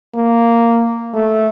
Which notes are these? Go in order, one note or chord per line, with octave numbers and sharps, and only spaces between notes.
A#3
A3